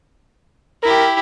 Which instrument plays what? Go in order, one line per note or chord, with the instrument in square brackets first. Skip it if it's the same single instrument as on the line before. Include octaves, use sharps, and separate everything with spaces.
[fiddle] E4 G4 [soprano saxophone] A#4